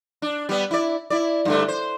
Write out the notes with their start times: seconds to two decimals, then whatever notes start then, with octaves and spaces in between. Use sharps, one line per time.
0.22 D4
0.49 G3 B3
0.71 E4 D5
1.10 E4 D5
1.45 G2 D3 A3
1.68 C5